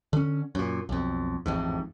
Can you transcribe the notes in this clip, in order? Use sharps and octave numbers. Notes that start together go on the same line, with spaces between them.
D3 C#4
F#2 A#2
B1 F2
A1 F2 G#2